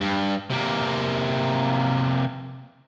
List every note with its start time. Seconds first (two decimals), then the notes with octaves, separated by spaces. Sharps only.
0.01 G2
0.50 C3 A#3